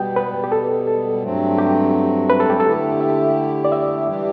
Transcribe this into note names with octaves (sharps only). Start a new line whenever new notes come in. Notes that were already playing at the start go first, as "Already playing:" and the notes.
Already playing: B2 G3 B3 G5
B4
G4
A4
A4
G2 F#3 A3 C4
G4
B4
A4
G4
A4
D3 A3 E4 G4
E5
D5
E5
E3 G3 D4 G4